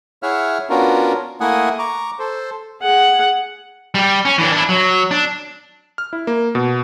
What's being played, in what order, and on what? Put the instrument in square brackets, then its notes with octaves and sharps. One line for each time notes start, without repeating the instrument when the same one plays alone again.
[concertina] E4 G#4 C#5 E5 F#5 F6
B3 C#4 D4 F4 F#4 A#4
A3 A#3 E4 F#5 G#5 D#6
A#5 C#6 D6
A4 C5
[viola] G#4 F#5
[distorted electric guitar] G3 G4
C#4
E3 D4
D4 E4
F#3
D4
[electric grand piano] F6
E4
A#3
B2